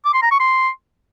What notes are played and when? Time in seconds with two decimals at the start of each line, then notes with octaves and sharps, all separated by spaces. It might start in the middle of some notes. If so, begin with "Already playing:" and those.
0.05 D6
0.14 C6
0.22 A#5
0.31 C#6
0.40 C6